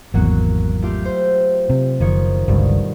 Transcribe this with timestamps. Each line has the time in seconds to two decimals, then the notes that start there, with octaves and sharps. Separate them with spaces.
0.14 G#1 E2 F#3 A#3 F#4
0.82 A3 F4 G4
1.05 C5
1.70 C3
2.00 F#1 D#3 F3 C#5
2.48 G1 C#2 G2 B2